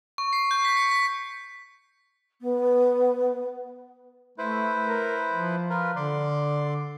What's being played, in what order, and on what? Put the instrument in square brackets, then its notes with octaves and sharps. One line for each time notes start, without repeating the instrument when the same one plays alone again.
[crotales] C#6
C7
G6
B6
C#7
B6
[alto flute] B3
[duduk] A3 [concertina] E4 B4 C5
[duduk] A#4
F3
[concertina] F4 A#4 B4
[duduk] D3 [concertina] D5 C6